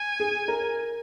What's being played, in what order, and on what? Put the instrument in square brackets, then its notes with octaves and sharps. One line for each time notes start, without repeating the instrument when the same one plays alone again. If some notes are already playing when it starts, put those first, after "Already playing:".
Already playing: [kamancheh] G#5
[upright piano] G#4
A#4